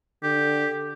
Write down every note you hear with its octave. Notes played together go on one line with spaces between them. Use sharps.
D3 G4